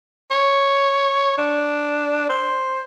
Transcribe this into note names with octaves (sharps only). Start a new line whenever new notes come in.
C#5
D4
C5